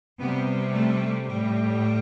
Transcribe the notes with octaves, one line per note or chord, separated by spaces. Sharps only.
C3 G3 B3
A3
A2 G3